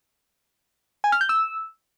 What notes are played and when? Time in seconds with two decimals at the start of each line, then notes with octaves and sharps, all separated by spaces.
1.04 G#5
1.12 F6
1.21 G6
1.29 E6